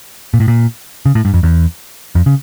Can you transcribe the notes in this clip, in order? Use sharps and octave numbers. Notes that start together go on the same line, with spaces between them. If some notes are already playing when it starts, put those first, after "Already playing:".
A#2
A2
A#2
C#3
A2
G2
F2
E2
F2
C#3